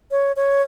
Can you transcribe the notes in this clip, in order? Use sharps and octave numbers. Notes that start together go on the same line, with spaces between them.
C#5
C#5